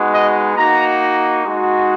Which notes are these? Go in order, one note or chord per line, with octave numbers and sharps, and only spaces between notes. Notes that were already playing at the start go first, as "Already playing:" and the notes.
Already playing: G#3 B3 D#4 F#4
D#5
A#3 D#4 F#4 A#5
G#3 D#4 F#4